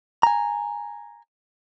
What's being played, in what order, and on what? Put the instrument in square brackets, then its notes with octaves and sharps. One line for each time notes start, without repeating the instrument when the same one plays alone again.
[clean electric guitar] G#5 A#5